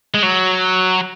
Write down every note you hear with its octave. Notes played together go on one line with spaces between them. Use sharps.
G#3
F#3